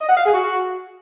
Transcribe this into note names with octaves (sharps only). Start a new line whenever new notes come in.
D#5
F#5
F5
G#4
F#4